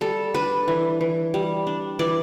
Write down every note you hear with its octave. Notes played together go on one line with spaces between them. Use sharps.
G3 A4
D4 B4
E3
E3
G3
D4
E3 D5